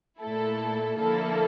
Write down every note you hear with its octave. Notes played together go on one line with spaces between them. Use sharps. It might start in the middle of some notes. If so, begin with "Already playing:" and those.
A#2 A3 E4 A4
D3 F3 A#3 E4 A4